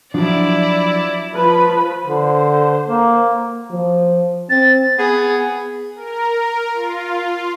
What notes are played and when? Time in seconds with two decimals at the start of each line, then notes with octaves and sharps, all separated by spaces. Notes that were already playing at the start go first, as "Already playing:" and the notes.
0.14 F3 F#3 D4 E4 D5
1.35 F3 B4 B5
2.05 D3 C5
2.87 A#3
3.71 F3
4.50 C4 A6
4.98 B3 G#4
5.96 A#4
6.74 F4